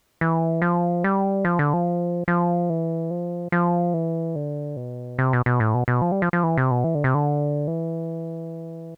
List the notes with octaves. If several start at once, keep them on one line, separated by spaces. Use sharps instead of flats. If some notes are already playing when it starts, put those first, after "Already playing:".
E3
F3
G3
F3
D3
F3
F3
E3
F3
F3
E3
D3
B2
C3
B2
B2
A2
B2
B2
F3
G3
F3
F3
E3
C3
B2
E3
D3
C3
D3
E3